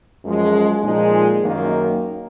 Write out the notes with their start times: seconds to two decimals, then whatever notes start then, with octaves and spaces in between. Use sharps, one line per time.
0.23 F#2 F3 G#3
0.83 A#2 F3 G#3 D#4 G#4
1.42 F#2 D#3 F#3 A#3 D#4